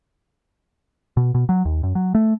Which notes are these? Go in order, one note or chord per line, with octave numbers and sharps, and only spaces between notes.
B2
B2
F#3
D#2
F#2
F#3
A3